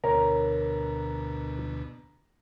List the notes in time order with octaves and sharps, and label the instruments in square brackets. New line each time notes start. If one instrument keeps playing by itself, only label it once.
[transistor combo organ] D2 B2 [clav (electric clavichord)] A#4 C#5 [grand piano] A#5